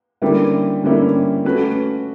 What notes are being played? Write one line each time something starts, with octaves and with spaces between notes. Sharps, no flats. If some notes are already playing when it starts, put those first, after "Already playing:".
D3 G3 A#3 C#4 E4
D3 G3 A#3 C#4 E4
A3 C#4 F#4 B4